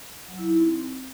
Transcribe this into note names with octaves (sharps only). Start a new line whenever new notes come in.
F#3
E4
D#4
C4